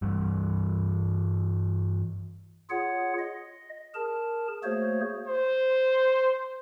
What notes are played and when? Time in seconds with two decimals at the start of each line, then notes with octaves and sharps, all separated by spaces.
0.02 G2 E3 G3
2.70 F4 G#4 C#5 F#5
3.19 D#5
3.95 G#4 A#4 A5
4.63 A3 A#3 F#4 G#4 C5 C#5
5.27 C5